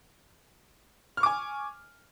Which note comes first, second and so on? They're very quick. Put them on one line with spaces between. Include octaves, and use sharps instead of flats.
F6 C#6 D6 G#5